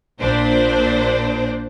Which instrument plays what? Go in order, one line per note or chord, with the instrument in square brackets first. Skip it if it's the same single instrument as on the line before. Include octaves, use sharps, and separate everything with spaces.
[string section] A#1 A#2 D4 C5